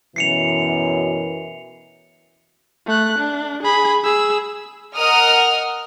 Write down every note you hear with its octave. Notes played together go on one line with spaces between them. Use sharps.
F#2 B2 E3 C7 C#7 F7
A3 F#6
D4
G#4 B5
G#4 E6
A#4 D#5 F#5 D#6 F6